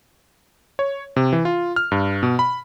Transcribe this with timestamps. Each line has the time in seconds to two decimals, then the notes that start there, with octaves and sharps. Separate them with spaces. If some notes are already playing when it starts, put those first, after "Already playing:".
0.79 C#5
1.16 C3
1.33 E3
1.45 F4
1.76 F6
1.92 G2
2.23 B2
2.39 B5